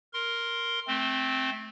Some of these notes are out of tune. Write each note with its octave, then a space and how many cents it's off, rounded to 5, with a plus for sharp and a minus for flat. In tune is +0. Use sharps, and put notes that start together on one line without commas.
A#4 +0 C6 +5
A3 -20 C4 +0